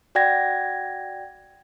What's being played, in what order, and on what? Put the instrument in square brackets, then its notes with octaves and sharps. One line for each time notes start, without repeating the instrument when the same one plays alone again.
[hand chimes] F#4 D5 F#5 G5 G#6 A#6